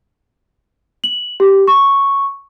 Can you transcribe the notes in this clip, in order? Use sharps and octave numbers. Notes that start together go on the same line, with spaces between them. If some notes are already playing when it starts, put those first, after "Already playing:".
F#7
G4
C#6